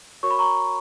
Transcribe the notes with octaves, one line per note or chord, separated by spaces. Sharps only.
F#4 A#4 C#5 C#6
B5
A#5 C#6